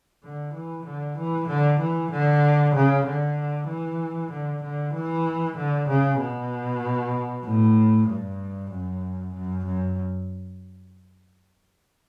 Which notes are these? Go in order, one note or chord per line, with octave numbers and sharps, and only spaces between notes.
D3
E3
D3
E3
D3
E3
D3
C#3
D3
E3
D3
D3
E3
D3
C#3
B2
A2
G2
F#2
F#2
F#2